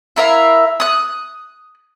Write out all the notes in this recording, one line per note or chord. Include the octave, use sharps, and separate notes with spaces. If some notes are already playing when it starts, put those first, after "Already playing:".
E4 A#4 E5 F5
D#6 F#6